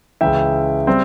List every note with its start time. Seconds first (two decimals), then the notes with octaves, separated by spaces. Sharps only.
0.21 C#2 C#3 E3 E5 G5
0.87 G3 C4